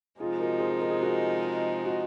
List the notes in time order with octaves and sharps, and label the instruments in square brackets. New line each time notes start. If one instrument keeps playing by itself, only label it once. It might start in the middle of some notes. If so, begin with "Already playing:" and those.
[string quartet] C3 F3 G#3 D#4 [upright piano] F4 G#4
[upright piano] F#4 A#4
G#4 C5
A#4
G#4
F#4 A#4
F#4